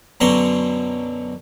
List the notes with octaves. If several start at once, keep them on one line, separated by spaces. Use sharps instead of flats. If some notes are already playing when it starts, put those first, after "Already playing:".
F#2 B2 D3 F#3 A#5 C6